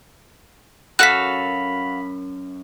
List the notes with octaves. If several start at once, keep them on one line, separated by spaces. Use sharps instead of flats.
F#2 F#4 A4 F5 B5 F#6 B6